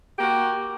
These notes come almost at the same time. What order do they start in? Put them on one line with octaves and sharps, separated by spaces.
G4 A#3 F#4